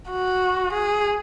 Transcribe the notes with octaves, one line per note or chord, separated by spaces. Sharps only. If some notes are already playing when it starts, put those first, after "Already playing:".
F#4
G#4